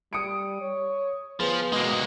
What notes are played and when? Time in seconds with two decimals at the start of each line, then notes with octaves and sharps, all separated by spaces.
0.13 G3 D#6 C#7 D7
0.61 C#5
1.40 F3 B3 G#4
1.73 B2 G#3 A#3